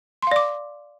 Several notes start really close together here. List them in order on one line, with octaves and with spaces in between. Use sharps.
C6 F5 D5 D6